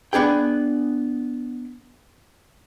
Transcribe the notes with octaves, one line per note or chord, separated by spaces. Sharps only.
B3 D4 G#4 G5